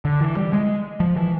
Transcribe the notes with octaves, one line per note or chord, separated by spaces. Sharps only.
D3
E3
G3
G#3
F3
E3